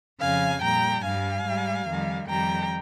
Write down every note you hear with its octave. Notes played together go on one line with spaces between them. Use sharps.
F2 C#3 F3 F5 G#5
A#2 G3 G5 A#5
G2 G3 F5 G#5
G#2 G3
F2 D#3 G3
F2 D#3 G3 G5 A#5